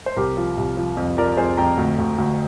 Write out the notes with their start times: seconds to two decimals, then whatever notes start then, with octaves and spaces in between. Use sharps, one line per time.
0.06 C5
0.16 C2 G4 A#4
0.37 F3
0.58 C2
0.77 F3
0.97 F2
1.17 F3 A#4 D5
1.37 F2 G#4 C5
1.57 F2 G5 A#5
1.77 D2
1.98 D2
2.18 D2